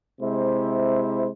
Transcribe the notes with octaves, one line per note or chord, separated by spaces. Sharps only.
C3 G#3 E4 C5